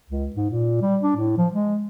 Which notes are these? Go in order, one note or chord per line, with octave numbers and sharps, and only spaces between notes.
C#2
G#2
A#2
G3
D4
A2
F3
G#3